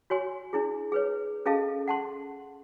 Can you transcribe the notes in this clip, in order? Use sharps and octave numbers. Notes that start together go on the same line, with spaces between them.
F#4 C#5 G#5 C6
D4 E4 G#4
G#4 B4 C#5
C#4 G#4 A4 D#5 F5 A5
F#5 A5 C6